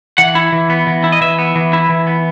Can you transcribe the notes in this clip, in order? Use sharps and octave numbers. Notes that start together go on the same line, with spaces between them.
E3 F#5
E4
E3
B3
E3
E4
D#5
E3 E5
B3
E3
E4
E3
B3